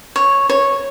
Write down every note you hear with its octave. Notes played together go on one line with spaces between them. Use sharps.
C#5
C#5